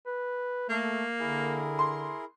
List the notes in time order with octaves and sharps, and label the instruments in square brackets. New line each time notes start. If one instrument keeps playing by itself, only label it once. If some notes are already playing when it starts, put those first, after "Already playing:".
[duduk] B4
[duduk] A3 [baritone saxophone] A#3 [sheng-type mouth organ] A4
[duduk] D3 [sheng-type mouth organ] E4 G#4 A#4
[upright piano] C6